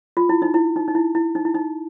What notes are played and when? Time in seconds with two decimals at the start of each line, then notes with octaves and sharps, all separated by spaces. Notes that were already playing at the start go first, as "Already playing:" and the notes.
0.17 F4
0.29 E4
0.42 D#4
0.54 E4
0.76 D#4
0.88 D#4
0.95 E4
1.15 E4
1.35 D#4
1.45 E4
1.54 D#4